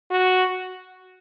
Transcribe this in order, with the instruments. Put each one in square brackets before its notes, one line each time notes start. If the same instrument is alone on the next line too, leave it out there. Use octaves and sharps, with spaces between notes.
[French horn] F#4